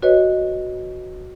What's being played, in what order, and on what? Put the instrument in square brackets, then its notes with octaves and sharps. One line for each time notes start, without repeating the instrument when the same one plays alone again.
[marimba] F#4 B4 C#5 D#5